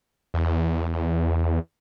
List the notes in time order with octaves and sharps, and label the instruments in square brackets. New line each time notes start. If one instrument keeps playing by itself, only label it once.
[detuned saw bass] E2